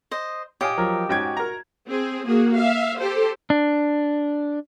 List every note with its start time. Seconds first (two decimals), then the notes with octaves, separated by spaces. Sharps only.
0.11 C5 D#5
0.61 G4 C#5 D#5 F5 G#5
0.77 F3 F#3 A#4
1.09 G#2 C#4 F#4 G5 G#6
1.37 A#4 A#5
1.89 C4 G#4
2.26 A#3 F#4 G#4
2.56 E5 F5
3.00 G4 A4 C5
3.50 D4